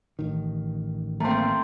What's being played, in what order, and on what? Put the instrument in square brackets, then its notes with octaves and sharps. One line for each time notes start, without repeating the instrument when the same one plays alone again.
[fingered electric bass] A1 D#3
[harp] A3 C4 [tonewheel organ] A#3 [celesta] A#5 C6